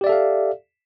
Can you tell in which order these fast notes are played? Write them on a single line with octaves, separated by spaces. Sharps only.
G4 D5 E5 A4 F5